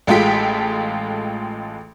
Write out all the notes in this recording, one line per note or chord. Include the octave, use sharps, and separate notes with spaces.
A1 G#3 F4 A4 G5 B6